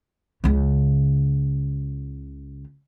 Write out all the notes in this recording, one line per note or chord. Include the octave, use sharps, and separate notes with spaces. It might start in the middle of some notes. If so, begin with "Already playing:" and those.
C#2 C#3